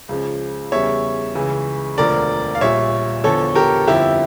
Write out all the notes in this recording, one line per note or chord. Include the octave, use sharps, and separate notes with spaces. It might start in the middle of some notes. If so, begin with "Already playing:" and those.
C#2 C#3 F3
E2 C#3 G3 C#5 E5
C#2 C#3 E3
E1 D2 D3 F3 A#4 D5
F5
A#1 A#2 G3 C#5 E5
E2 D3 F3 A4 C#5
G4 A#4
G1 F2 D3 F3 E4 G4